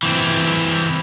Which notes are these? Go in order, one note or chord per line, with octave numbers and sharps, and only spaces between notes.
E3 C4